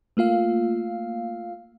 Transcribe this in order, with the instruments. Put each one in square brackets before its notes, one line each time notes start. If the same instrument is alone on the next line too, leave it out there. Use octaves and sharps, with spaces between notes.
[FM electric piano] A3 A#3 F4 F5